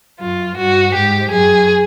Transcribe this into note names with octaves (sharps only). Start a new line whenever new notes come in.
F#2 F4
G2 F#4
G#2 G4
F#2 G#4